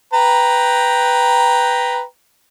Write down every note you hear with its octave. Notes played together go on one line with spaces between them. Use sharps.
B4 G5 A#5